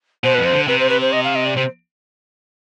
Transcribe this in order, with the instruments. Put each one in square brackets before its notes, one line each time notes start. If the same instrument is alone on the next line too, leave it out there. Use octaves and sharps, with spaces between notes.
[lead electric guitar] B2 [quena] C5
[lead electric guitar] F2 [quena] B4
[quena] C5
[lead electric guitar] D3
[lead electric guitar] C3 [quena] B4
[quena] C5
B4
C5
D#5
F5
D#5
D5
[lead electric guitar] C3 [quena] C5